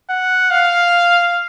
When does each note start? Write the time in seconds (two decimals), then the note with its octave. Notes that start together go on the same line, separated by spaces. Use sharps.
0.10 F#5
0.51 F5